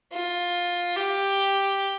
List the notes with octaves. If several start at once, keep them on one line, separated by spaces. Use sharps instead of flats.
F4
G4